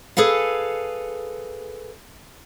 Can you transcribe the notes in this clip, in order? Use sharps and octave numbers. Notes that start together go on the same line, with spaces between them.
G#4 A4 B4 F5